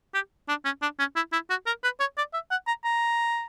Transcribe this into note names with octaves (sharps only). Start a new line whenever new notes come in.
G4
D4
C#4
D4
C#4
E4
E4
F#4
A#4
B4
C#5
D5
E5
F#5
A#5
A#5